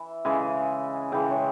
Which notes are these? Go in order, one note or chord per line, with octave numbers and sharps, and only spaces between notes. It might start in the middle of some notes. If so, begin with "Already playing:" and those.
Already playing: E3
C#3 E3 G#3 G#5
C#3 E3 G#3 G5
C#5